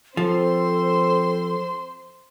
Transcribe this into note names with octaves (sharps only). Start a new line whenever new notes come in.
F3 C4 A4 C5 C6